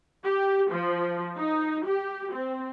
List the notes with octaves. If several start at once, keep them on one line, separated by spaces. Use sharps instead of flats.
G4
F3
D#4
G4
C4